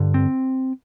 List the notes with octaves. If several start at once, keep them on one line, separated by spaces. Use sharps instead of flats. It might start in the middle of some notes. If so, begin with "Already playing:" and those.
Already playing: G2 D3
C4